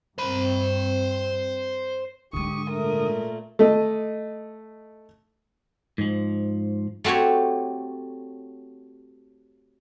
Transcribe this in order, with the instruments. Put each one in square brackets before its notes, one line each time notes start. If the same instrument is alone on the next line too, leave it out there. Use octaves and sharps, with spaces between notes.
[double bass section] G2 C4 [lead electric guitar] C5 B5
[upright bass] G#2 G#3 [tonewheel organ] D3 D#6 [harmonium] G4 [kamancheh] C#6
[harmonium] A#2 A3 [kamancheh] A#4
[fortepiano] A3 D#5
[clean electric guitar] G#2 F3
[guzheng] A3 C4 F#4 G4 C#5